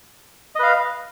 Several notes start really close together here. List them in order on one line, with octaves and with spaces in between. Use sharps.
D#5 B4 F5